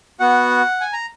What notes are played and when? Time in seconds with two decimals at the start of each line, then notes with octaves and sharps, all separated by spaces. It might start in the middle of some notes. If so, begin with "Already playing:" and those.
0.20 B3 F#4 F#5
0.81 G#5
0.93 A#5